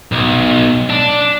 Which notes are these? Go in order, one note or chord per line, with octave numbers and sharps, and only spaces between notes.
B1
D4